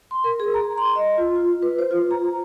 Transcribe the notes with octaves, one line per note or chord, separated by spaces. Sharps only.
C6
A#4
G#4
A#5
C6
D#5
F4
F4
B4
C5
F4
A#5